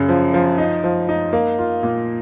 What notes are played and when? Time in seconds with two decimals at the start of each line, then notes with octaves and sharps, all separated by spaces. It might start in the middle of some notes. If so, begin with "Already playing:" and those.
Already playing: F#2 C#3
0.09 F3
0.34 F3
0.58 D#4
0.84 F3
1.09 D#4
1.33 A#3
1.58 F4
1.83 A#2